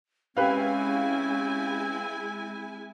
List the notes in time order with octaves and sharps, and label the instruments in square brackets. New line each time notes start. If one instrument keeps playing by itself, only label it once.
[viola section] G#3 E4 G#5 [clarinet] C4 [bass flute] C#4 [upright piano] G4 B4 F5